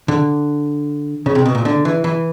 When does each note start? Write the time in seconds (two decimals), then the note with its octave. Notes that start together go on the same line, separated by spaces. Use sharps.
0.08 D3
1.26 C#3
1.35 C3
1.46 B2
1.55 A#2
1.65 D3
1.85 E3
2.04 E3